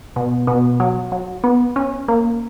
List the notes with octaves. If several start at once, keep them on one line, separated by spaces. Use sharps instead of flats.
B2
B2
F#3
F#3
B3
C#4
A#3